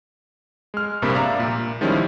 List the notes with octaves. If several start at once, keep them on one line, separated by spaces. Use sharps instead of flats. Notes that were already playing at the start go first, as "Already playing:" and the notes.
G#3 F6
A#1 G2 C3 A#3 A#4 B5
D5 E5 F5 A#5
A#2
D#3 F3 G3 G#3 C#4 E4